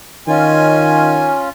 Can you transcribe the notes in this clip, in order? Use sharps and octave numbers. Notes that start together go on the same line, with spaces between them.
D#3 C#4 F4 D#5 G#5